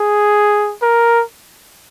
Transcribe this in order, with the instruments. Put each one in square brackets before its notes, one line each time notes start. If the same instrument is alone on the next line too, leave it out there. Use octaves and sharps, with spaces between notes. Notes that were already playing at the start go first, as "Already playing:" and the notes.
Already playing: [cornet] G#4
A#4